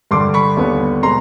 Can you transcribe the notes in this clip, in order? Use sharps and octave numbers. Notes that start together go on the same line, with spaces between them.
G2 D3 G3 C6 D6
B5 C#6
D#2 D3 G3 B3
B2 G#3 B3 A#5 C6